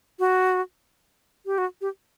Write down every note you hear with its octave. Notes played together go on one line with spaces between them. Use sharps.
F#4
G4
F#4
G4